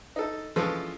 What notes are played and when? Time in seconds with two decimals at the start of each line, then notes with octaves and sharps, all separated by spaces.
0.16 D#4 A4
0.56 E3 F3 G#3 C#4 F4 A4